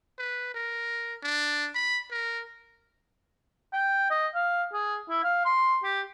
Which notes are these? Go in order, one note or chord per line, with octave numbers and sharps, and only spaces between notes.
B4
A#4
D4
B5
A#4
G5
D#5
F5
G#4
E4
F5
C6
G4